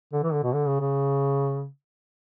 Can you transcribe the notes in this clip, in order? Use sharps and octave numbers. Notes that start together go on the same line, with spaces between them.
D3
E3
D3
B2
D3
C#3
C#3